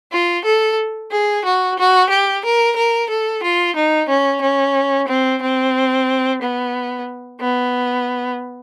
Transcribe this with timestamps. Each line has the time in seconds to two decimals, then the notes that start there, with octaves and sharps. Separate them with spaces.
0.12 F4
0.45 A4
1.12 G#4
1.43 F#4
1.78 F#4
2.10 G4
2.44 A#4
2.77 A#4
3.09 A4
3.43 F4
3.76 D#4
4.09 C#4
4.42 C#4
5.08 C4
5.42 C4
6.42 B3
7.40 B3